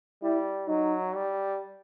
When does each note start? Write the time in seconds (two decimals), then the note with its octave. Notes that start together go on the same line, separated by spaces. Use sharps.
0.23 G3 E4
0.68 F#3 D#4
1.15 G3